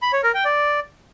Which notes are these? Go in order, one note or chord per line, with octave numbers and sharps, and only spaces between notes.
B5
C#5
A#4
G5
D5